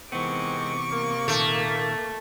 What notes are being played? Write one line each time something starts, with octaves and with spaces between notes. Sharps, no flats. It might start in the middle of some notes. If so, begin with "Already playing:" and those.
C3 D#3 E3 G#3 B3 C4 C#6 D6
A#3
A#2 D#3 A3